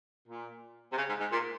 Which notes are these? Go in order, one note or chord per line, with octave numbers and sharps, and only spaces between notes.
A#2
C3
C#3
G#2
G#2
A#2